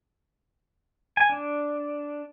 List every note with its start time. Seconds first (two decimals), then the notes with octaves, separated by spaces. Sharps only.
1.17 G#5
1.30 D4